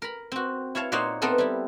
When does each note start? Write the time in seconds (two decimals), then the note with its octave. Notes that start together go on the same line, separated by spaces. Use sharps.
0.02 A#4 B5
0.32 C4 F#4
0.75 E4 C#5 F5 A5
0.92 A#2 A#3 D#4 C5 C#5 F#5
1.22 A3 B3 C4 A4 A#4
1.38 G3 E4